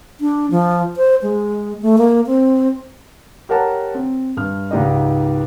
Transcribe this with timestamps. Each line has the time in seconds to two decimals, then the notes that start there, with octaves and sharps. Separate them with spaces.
0.21 D4
0.51 F3
0.97 C5
1.22 G#3
1.82 A3
1.98 A#3
2.27 C4
3.49 G4 A#4 C#5 F#5 A5 A#5
3.95 C4
4.37 G2 F6
4.71 C#2 G#2 D#4 G4 D5 D#5